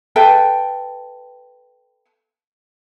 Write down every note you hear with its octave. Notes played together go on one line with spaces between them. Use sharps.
A4 B4 E5 G5